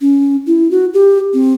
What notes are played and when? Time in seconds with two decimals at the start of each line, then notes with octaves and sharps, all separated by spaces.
0.01 C#4
0.47 E4
0.71 F#4
0.94 G4
1.34 C4